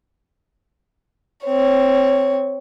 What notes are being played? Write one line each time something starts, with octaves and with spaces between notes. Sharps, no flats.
C4 C#5